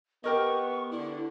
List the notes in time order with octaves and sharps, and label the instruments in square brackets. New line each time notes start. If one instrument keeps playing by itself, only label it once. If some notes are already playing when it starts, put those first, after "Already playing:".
[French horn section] B3 [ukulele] G4 A#4 D#5 [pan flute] C#6
[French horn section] D3 [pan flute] E4